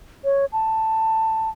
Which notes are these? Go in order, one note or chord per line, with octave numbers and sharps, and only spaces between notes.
C#5
A5